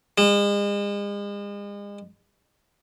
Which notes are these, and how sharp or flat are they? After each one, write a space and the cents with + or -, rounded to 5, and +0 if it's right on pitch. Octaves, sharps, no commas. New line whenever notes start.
G#3 -40